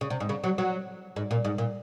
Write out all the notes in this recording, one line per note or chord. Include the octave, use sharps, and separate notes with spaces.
C#3
C3
G#2
C#3
F#3
F#3
G#2
A#2
G#2
A#2